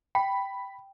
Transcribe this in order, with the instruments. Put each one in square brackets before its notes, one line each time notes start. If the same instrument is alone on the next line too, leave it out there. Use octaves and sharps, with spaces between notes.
[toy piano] G5 [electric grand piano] B5